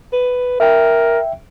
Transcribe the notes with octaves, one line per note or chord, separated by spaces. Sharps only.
B4
A#4 E5 G5